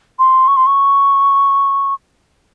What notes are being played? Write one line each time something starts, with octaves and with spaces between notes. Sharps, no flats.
C6
C#6
C6
C#6